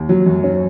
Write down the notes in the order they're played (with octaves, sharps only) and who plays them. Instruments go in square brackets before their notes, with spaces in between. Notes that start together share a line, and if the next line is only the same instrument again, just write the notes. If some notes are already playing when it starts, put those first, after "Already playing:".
Already playing: [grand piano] D#2
F#3
F#2
C#4